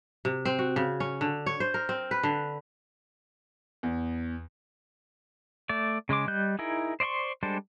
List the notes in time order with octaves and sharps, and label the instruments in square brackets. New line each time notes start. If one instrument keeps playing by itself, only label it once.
[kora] C3
C4
F#4
C#3
C#4
D3
C#5
C5
A#4
C4
B4
D3
[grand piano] E2
[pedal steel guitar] A3 D5
C#3 G#3 C6 D6
G3 D#5 F#6 G6
D#4 E4 G#4 A#4
C5 D5 D#5 C6 C#6
G3 G#3 D4 A4 C5